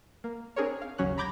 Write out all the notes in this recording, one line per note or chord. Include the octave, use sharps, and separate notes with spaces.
A#3
C4 D4 G#4 A#4 C#5
F5
G#1 D#2 C#3 F#3 C#4 F#6
A#5 B5 D6 G6 G#6 A#6